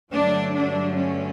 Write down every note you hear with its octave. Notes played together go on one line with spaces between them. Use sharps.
G2 D3 F#3 A3 D4
D4
C#4